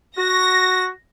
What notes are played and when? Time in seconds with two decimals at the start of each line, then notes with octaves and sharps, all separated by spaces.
0.18 F#4 A#6